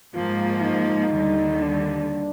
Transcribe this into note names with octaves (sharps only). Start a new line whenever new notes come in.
G#2 F3 A#3 F4
D#4
D#2 D3 G3
D4